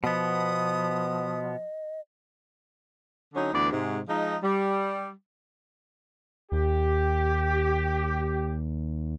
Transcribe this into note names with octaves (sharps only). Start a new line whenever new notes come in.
B2 F3 B3 D#5 D#6
D3 F#3 C#4 D#4
D2 E3 B3 D5
G#2 C3
F3 G#3 D#4
G3
D#2 G4